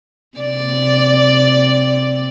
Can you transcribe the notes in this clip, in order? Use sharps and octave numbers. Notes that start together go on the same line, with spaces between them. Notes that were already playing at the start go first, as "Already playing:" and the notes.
C3 D5